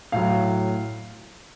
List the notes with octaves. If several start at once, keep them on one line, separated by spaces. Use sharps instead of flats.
A2 F#3 F5